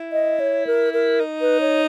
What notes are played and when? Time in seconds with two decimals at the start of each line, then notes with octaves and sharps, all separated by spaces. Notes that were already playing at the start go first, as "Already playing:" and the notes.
Already playing: E4
0.12 D#5
0.40 C#5
0.67 A#4
0.93 A#4
1.20 D#4
1.41 B4
1.61 C#5